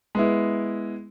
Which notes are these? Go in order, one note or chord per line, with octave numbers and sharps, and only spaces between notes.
G#3 B3 E4